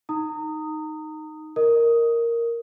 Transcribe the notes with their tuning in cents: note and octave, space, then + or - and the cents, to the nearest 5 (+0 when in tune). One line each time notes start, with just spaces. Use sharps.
D#4 +0 A#5 -30 D#6 +0
A#4 -5 D#5 +0 D#6 +10